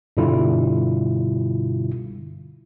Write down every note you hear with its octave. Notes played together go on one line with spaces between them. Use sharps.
G2 B2 D3 G3 E4 F4